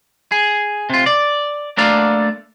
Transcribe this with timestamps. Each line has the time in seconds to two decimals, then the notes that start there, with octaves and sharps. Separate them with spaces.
0.32 G#4
0.90 C3 F4
1.06 D5
1.77 A3 A#3 D4 A4 D5 F5